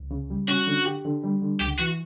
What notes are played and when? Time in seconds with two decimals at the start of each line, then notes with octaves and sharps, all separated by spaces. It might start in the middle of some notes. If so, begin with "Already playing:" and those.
Already playing: C#2
0.11 C#3
0.30 G3
0.48 C#4 F#4
0.67 D3
0.85 G4
1.05 D3
1.24 G3
1.42 D3
1.60 C#2 G4
1.79 E3 F#4